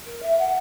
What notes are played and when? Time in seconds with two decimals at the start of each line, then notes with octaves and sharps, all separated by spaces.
0.05 A#4
0.22 E5
0.38 F#5